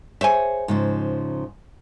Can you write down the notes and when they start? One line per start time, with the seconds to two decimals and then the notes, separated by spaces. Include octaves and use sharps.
0.21 G#4 C5 C#5 E5 G#5
0.68 G#2 C#3 F3